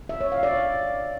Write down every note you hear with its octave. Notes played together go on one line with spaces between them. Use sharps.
E5
C#5
F5
D5